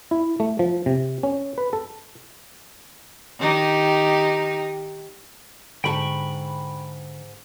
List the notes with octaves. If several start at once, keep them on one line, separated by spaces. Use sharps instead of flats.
E4
A3
F3
C3
C#4
B4
A4
D#3 D#4 G4
G#2 D3 A4 G5 A5 B5 C#6